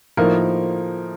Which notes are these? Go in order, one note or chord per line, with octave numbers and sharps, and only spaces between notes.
A2 F3 A#3 D#4 A#4